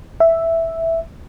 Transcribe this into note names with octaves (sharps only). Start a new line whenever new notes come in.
E5